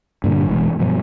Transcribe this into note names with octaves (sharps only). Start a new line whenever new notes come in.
G2 A#2 D3
F1 B2 E3 G#3
G2 B2 F3